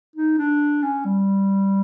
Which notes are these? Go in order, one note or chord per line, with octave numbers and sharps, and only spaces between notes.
D#4
D4
C#4
G3